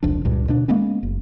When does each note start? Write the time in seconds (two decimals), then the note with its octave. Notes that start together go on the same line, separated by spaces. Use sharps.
0.03 E1 C2 F3 D4
0.25 C#2 G2 A#2
0.47 D2 B2 A3 D4
0.68 G#3 A#3 B3 C#4
1.03 F#1